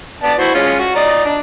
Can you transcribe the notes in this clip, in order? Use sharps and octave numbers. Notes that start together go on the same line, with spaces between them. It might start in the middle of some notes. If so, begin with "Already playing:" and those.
B3 D5 A5
E4 F#4 C5
G#3 C#4 F4
F#4
D5 D#5 A#5
D4